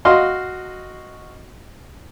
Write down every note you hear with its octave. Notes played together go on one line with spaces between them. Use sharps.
F#4 D#5 F5 C6